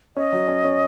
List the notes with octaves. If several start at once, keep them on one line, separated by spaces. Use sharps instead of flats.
C#4 D#5
F#3
C#4
C#4